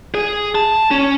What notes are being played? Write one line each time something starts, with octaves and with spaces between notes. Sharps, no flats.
G#4
A5
C#4